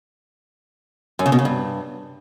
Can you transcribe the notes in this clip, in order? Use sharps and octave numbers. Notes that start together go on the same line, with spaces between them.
F#2
C#3
B2
C#3
G2